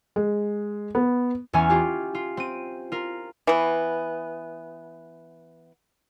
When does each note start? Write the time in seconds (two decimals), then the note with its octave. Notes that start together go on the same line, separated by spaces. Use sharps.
0.16 G#3
0.95 B3
1.53 E2 E3 C#4 G#5 F6
1.70 F4 G4
2.15 F4
2.37 C4 D#7
2.92 F4 A#4
3.47 E3 B3